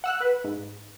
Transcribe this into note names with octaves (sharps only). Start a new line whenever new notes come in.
F#5 E6 F#6
B4
G#2